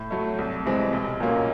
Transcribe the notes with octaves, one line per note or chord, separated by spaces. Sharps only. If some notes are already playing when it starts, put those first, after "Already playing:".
Already playing: A2
F#3 A3
C2
C3 E3 G#3 C4
B1
A#2 F#3 A#3 C#4